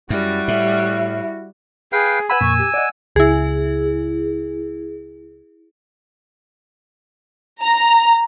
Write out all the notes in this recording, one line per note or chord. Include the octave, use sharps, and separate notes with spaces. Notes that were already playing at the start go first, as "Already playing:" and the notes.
F#2 G3 E4 F#4
A2 E5
G#4 B4 F5 G5
B4 F#5 G#5 B5 E6
F2 A#2 C#6
G4
D5 D#5 F#5
C#2 E4 G#4
A#5